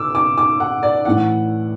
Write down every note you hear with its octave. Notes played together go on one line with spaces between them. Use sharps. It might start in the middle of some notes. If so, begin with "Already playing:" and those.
Already playing: B2 D6 E6
D6
D6
F#5
D5
A2 E3 F#5